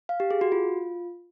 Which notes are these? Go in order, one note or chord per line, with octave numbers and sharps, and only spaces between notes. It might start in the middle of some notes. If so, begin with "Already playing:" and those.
F5
G4
G#4
F#4
F4